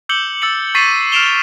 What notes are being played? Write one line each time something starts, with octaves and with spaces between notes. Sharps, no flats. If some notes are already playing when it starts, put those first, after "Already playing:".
D6 E6 G6 C#7 F#7 G7
E6 A6 C#7 F#7
C#6 A6 B6 C7 D#7 E7
F6 C7 D7 E7 F7 G7